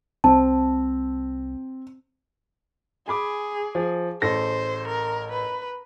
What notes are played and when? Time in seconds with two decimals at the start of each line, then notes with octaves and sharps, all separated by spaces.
0.24 C2 C4 A5
3.08 G#4 G#5 B5 D6
3.75 F3
4.22 A1 A4 C5 A#6
4.88 A#4
5.32 B4